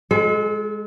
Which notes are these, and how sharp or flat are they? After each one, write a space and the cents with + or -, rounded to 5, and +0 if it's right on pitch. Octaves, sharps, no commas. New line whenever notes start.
G#3 +0 A4 -40